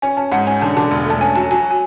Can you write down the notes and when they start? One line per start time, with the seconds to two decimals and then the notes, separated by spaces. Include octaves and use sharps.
0.02 C#4 G#5
0.17 C#4 A5
0.32 G#2 F#5
0.47 C#4 G#5
0.62 D3 A5
0.77 D3 A5
0.91 E1
1.06 A3 A5
1.21 C#4 G#5
1.36 F#3 A5
1.51 F#3 G#5
1.71 G#5